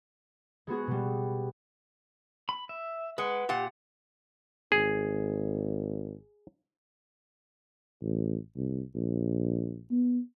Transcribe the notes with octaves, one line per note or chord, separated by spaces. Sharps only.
G#3 B3 F#4 G#4
B2 G3
B5
E5
G#3 B4 F#5
A#2 G4 F#5
G#1 G#4
A1
C2
A#1
B3